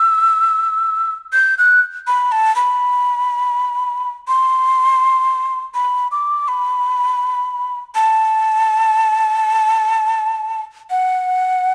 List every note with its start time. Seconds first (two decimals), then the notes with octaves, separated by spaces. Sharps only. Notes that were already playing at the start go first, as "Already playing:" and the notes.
Already playing: E6
1.33 G6
1.58 F#6
2.07 B5
2.32 A5
2.56 B5
4.28 C6
5.74 B5
6.11 D6
6.48 B5
7.95 A5
10.90 F#5